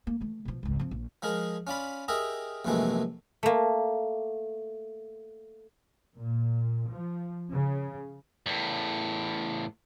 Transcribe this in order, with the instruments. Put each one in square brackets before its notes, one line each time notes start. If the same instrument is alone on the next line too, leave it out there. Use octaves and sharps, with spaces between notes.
[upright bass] A#3
E3 A3
B2 F3
G#1 C#2
F3 C4
A#1
[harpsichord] F3 G#3 G#4 A#4
C#4 F4 D5 B5
G4 G#4 A#4 D#5 E5
A#1 F#2 C3 E3 G#3 A3
[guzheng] A3 A#3
[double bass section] A#2
F3
C#3
[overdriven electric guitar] E2 A2